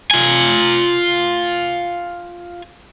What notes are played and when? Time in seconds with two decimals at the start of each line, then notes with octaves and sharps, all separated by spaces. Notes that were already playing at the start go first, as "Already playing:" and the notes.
0.11 F4 G#5